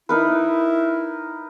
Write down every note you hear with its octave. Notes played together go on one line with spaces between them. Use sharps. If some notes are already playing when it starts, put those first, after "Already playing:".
D#4 E4 A#4 B4